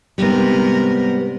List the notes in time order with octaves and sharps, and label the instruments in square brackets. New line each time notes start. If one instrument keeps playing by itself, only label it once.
[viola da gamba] G#2 C3 A#4 [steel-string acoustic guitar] G3 B3